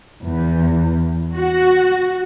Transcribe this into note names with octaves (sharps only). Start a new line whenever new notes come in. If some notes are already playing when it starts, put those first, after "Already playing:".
E2
F#4